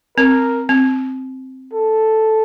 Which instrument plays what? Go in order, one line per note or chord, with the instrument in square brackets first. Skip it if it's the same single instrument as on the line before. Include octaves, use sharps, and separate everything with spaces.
[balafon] C4 [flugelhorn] A#4
[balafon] C4
[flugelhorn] A4